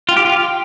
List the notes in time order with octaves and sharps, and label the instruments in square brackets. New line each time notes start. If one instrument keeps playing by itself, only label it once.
[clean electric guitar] F4 [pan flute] G5
[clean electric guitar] G4
F4
[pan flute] G5